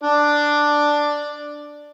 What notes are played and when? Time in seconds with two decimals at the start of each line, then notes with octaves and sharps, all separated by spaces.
0.03 D4 D5